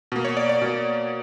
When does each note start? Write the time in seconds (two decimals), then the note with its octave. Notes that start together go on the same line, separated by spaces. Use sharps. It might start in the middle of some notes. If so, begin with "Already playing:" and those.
0.12 B2 A#3
0.25 C#5
0.37 D5
0.49 D5
0.61 B2 A#3